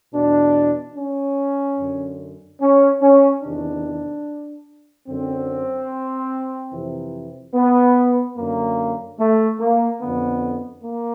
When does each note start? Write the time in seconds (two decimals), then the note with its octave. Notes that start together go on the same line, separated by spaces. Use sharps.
0.14 E2 B2 D4
0.97 C#4
1.79 F#2 D3
2.61 C#4
3.02 C#4
3.43 E2 C3 D#3 D4
5.08 F#2 D3 C4
6.72 F2 C3 E3
7.55 B3
8.37 F#2 D3 A#3
9.19 A3
9.60 A#3
10.01 F2 D3 B3
10.84 A#3